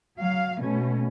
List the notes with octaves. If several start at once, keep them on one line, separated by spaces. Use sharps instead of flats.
F#3 F5
B2 A3 C#4